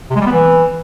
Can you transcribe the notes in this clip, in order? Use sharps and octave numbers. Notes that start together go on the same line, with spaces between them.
C3
G#3
G3
B3
E3